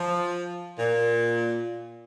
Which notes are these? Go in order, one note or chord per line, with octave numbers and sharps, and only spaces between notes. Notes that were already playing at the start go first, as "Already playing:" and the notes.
Already playing: F3
A#2